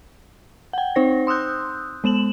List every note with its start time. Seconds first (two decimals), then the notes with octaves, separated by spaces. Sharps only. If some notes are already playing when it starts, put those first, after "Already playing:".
0.73 F#5 G5
0.96 C4 D#4 C5 A#6
1.27 C6 D#6 E6 F#6 G6
2.04 G#3 B3 E7 F#7